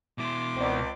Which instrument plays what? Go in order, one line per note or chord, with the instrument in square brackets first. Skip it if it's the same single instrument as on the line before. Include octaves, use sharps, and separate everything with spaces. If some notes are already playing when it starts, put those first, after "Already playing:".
[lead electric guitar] B2 E4 [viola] C6 D6
[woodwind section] C#2 [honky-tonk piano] C4 D5